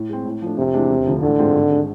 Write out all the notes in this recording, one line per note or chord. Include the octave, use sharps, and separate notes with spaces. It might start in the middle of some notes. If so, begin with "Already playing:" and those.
Already playing: A2
G#3 C4
A2
F3 A3 D4
F2 C3
E3 G#3 D4
E1
D2 D3 F3
A1 D3
G#2 G#3 C4 F4
G#1
G#3 D4